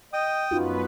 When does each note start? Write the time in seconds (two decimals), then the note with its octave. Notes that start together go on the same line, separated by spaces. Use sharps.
0.13 D#5 G5 D#6
0.51 F#2 B3 C#4 D#4 F4 F#4 B4